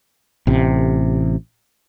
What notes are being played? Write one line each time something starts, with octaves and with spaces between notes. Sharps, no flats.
A1 C3